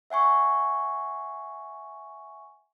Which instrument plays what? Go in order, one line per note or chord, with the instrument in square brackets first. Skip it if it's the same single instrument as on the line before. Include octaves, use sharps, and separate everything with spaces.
[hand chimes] E5 F#5 G#5 C#6